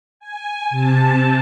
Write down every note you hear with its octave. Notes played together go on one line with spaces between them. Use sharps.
G#5
C3 A5